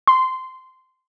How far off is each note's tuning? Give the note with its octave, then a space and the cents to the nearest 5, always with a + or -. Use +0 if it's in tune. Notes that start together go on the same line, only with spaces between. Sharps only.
C6 -15